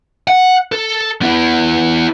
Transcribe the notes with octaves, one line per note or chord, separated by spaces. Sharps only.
F#5
A4
B3 E4